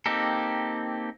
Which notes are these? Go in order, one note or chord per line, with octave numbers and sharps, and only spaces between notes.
A#3 C4 D#4 G4 A4